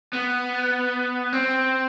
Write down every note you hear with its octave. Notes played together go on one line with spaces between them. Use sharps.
B3
C4